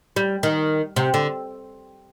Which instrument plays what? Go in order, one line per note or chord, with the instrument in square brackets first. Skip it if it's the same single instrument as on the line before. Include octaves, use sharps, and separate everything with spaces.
[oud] G3
D#3
C3
D3